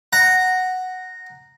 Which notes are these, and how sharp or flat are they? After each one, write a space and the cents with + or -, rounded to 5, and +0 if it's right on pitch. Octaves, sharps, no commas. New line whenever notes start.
F#5 +0 A#5 -10